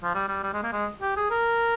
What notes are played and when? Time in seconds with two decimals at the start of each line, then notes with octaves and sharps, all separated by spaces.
0.03 F3
0.15 G3
0.28 G3
0.43 G3
0.53 G#3
0.63 A#3
0.73 G#3
1.02 G4
1.17 G#4
1.31 A#4